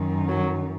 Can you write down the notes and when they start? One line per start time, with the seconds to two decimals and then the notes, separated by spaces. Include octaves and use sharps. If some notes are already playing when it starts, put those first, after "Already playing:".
Already playing: F#2 D#3
0.28 F#3